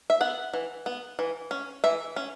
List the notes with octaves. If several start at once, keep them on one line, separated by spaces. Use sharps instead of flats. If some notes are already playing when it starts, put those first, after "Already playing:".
E5
B3 F#5
E3
B3
E3
C#4
E3 E5
C#4